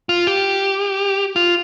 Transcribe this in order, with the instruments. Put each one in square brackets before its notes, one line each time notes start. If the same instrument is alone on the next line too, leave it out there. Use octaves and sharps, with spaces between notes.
[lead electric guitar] F4
G4
F4